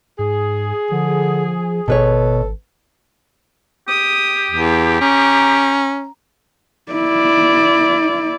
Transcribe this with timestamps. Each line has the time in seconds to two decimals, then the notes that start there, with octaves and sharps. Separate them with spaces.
0.19 G#2 G#4
0.91 D3 F3
1.88 G#1 B2 A4 B4 C#5
3.88 G4 D#6
4.51 E2
5.01 C#4 A#5
6.92 E4 D5